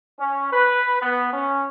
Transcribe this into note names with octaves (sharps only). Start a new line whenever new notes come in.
C#4
B4
B3
C#4